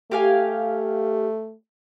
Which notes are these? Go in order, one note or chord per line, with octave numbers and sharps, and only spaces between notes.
A3 G4 F5 G#5